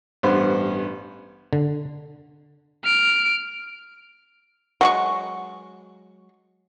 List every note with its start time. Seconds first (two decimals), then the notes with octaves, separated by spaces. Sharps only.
0.23 A1 G2 B3 C5
1.53 D3
2.84 F6 D7
4.81 F#3 G#3 F#4 C#6